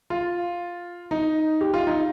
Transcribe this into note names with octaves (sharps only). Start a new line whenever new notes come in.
F4
D#4
G4
F4
D#4